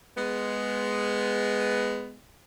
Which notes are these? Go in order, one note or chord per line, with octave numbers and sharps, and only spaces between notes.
G#3 B3